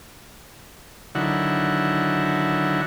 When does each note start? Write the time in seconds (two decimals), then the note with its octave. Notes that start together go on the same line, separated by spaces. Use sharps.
1.15 D3 D#3 F#3 E4 F#5